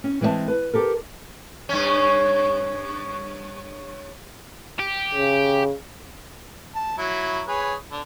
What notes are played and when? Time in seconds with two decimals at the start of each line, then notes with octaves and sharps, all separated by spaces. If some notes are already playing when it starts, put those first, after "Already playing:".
0.04 C#4
0.21 E3 G#3 C4 D5 E5 A5
0.48 B4
0.73 G4 A4 A#4
1.69 G2 C#4
4.79 G4
5.14 C#3
6.75 A5
6.98 F#3 E4
7.48 G#4 B4 C#5
7.91 D3